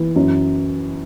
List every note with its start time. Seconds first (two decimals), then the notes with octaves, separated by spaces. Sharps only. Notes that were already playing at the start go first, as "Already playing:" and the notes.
Already playing: E3
0.16 F#2